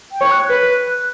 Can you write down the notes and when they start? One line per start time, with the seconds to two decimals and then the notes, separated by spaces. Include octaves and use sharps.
0.12 G5
0.21 C#5
0.30 F#6
0.49 B4 F#6